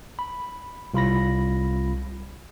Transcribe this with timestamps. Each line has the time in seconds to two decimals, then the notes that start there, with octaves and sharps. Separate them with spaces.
0.19 B5
0.94 C2 F4 B5 A#6